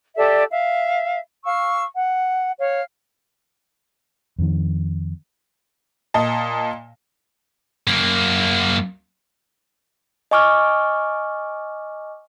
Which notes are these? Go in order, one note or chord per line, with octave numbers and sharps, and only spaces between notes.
G4 A4 D5 E5
E5 F5
F5 C#6 E6
F#5
C#5 F5
F2 D#3
A#2 D#5 A5
F#2 A#3
D#5 G#5 C#6 D6 F6